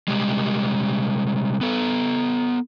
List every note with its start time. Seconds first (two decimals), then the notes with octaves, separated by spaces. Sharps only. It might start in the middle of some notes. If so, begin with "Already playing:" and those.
0.08 C3 G3 G#3
1.61 B3 A4